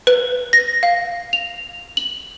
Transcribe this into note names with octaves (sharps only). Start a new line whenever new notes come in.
B4
A#6
F5
F7
F#7